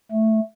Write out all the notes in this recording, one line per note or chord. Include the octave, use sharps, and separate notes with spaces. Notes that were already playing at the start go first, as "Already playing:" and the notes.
A3